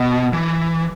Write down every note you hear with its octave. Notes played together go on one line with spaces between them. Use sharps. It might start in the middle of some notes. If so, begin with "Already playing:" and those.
Already playing: B2
E3